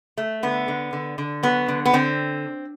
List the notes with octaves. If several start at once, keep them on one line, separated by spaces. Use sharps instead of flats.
A3
D3 B3
D3
D3
D3
F#3 B3
D3
B3
D3 C4